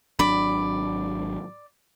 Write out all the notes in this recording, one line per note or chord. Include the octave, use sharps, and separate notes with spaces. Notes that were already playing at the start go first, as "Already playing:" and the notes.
G#1 F#3 D4 D5 B5